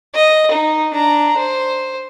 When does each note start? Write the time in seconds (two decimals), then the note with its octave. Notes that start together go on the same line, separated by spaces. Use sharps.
0.15 D#5
0.51 D#4
0.93 D4 A#5
1.37 C5